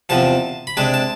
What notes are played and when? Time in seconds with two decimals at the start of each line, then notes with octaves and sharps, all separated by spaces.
0.09 E2 C3 F3 A5
0.67 B5
0.77 C3 G#3 D4 A5
0.94 A5